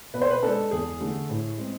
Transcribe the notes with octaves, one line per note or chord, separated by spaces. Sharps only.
B2 B4
C5
B4
G#3 D4 A4
E2 G#4
D3 A3
A2
G#3 C4